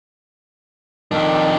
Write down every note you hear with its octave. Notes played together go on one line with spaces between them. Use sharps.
F2 D#3 D4